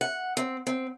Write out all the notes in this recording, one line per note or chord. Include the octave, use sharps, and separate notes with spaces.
F#5
C4
C4